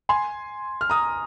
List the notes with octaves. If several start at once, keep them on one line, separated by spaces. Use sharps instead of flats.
G#5 C6
F6
A#5 D#6